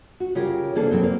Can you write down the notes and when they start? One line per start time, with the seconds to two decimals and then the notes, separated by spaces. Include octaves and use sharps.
0.20 F#4
0.35 C#3 F4 G4 G#4 A#4
0.75 C3 E3 A#3 D4 G#4 A4
0.91 B2 F#3 C4
1.03 A#3